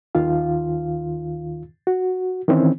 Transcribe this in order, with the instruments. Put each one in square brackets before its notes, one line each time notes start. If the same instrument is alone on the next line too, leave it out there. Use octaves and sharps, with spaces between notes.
[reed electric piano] D#2 D#3 F4 F5
F#4
D#3 E3 C4 C#4